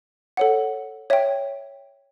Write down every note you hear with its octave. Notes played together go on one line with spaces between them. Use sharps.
A4 C#5 F#5
C#5 E5 G5